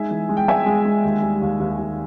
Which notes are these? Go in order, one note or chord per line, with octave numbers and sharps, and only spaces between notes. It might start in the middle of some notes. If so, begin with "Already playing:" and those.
Already playing: G#3 D#4 E5 G#5
E3
G#3
G5
G#3 E5 G#5
G#3
G#3
D#2
G3
D#2
D#2
D#2